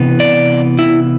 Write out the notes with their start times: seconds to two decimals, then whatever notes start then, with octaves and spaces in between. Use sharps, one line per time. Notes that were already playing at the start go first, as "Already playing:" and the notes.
Already playing: C3 E3 B3
0.20 D5
0.79 E4